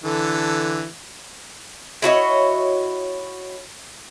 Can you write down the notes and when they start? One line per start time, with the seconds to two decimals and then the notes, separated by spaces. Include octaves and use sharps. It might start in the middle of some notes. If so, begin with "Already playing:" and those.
0.04 D3 E3 A4
2.02 E4 F#4 C#5 D#5